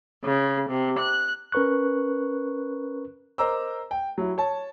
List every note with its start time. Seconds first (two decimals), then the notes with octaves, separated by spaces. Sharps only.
0.23 C#3
0.69 C3
0.99 F#6
1.52 C#4 A#4 B4 C#6 F#6
3.38 A#4 C5 D#5 A#5 D6 E6
3.91 G5
4.18 F#3 E4
4.38 C#5 A5